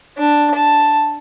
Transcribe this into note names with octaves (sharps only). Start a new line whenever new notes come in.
D4
A5